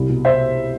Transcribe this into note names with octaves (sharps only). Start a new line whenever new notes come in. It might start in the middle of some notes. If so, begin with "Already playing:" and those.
Already playing: C2
B2
C5 E5